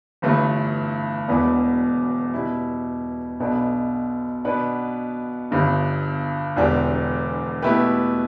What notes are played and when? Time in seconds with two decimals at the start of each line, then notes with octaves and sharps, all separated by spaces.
0.22 G1 G2 E3 A3
1.28 E1 E2 B2 B3 D4
2.34 B2 G3 E4
3.40 B1 B2 B3 D4 A4
4.45 B2 B3 D4 B4
5.51 G1 G2 D3
6.56 E1 E2 D3 G3 D4
7.62 B2 A3 E4 G4 B4